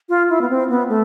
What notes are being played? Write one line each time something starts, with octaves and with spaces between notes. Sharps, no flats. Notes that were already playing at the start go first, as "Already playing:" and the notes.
F4
E4
B3
C4
B3
A3